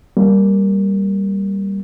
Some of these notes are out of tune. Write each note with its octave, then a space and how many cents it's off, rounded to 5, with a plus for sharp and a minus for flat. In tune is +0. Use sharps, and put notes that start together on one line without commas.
G3 +0 A#3 +0